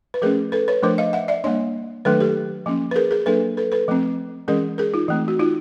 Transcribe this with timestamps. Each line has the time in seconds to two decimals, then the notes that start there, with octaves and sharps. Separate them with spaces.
0.14 B4
0.22 F3 A3 C#4 G#4 A#4
0.52 A4 B4
0.68 B4 C#5
0.83 F3 A3 D4 A#4 C5
0.98 D#5 F5
1.13 E5 F#5
1.28 D5 E5
1.44 G3 A#3 D4 C#5 D#5
2.05 D#3 F#3 A3 D4 A4 B4
2.20 G4 A4
2.66 F3 A#3 C#4
2.91 B4
2.96 G#4 A#4
3.11 G#4 A#4
3.26 F#3 A#3 D4 A4 B4
3.57 A4 B4
3.72 A4 B4
3.88 F3 A3 C4
4.48 E3 G#3 C#4 G#4 A#4
4.78 G#4 A#4
4.94 D#4 F4
5.09 E3 A3 C4
5.28 F#4
5.39 D#4 F4